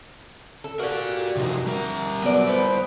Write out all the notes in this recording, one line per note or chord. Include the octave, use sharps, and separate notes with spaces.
A4
F#4 G4 A#4 D5
C3 F3 D#4
G3 A#4
F#3 B3 D5
B3 B4 C5 G5